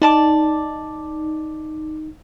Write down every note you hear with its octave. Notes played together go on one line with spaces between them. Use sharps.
D#4 D5 A5 D6